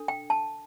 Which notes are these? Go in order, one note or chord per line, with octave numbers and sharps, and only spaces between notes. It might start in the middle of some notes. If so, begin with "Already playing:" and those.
Already playing: D4 A4
G5
A5